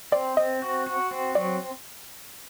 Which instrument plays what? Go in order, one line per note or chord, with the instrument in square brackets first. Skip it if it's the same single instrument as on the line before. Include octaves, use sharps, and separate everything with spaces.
[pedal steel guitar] C4 [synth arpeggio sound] D5
[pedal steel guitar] C4 [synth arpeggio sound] D#5
[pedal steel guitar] F#4
F#4
C4
[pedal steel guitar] F#3 [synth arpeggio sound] D5